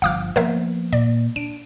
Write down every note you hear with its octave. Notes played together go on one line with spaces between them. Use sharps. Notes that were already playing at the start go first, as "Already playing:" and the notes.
G1 F3 F5 D6 F6
F3 A#3 B3 A#4 C5 E5
A#2 D5
D4 D7